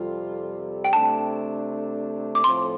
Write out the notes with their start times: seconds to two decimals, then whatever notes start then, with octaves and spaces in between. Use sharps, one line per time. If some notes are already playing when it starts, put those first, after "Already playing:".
Already playing: F2 C3 G3 F4 A4
0.84 G5
0.93 C3 A3 D4 A5
2.35 D6
2.44 A2 F3 C4 A4 C5 C6